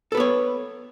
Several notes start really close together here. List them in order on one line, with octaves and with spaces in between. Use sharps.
A4 B4 B3 C#5